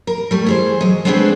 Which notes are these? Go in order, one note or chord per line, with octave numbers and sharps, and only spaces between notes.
A#4
G3 A3
E3 G#4 C5
F#3 D#5
G#3 A3 B3 C4 D4 G#4